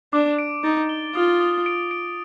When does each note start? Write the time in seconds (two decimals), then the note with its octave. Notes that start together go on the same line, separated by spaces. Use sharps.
0.13 D4 D6
0.39 D7
0.64 D#4 A6
0.89 G7
1.14 F4 D#6
1.40 D#6
1.66 D7
1.91 D7